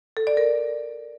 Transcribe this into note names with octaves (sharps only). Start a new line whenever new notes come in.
A4
D5
A#4